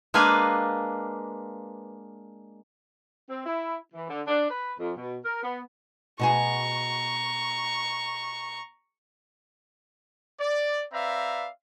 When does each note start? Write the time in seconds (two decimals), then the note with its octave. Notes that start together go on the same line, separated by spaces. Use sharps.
0.14 G#3 A#3 D4 B4 F5 G#5
3.28 C4
3.45 E4
3.94 E3
4.09 D3
4.26 D4
4.49 B4
4.79 F2
4.96 B2
5.24 A#4
5.43 B3
6.19 B2 F#4 G#4 A#5 C#6
10.40 D5
10.92 C4 B4 D5 E5 F5 A#5